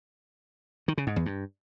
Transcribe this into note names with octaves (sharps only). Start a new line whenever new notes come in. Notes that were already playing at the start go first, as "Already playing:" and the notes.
D#3
C#3
G#2
E2
G2